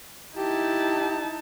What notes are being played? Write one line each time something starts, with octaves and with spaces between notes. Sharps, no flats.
D#4 E4 G4 A5